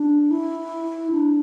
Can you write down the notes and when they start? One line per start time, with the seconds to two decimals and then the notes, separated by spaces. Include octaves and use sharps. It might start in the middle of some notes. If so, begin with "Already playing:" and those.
Already playing: D4
0.31 E4
1.11 D4